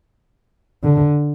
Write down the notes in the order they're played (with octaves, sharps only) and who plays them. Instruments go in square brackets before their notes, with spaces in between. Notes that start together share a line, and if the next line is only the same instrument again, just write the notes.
[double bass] D3